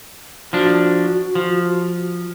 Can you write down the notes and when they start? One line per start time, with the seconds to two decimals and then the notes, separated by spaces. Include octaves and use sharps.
0.53 F3 D4 F#4
1.35 F3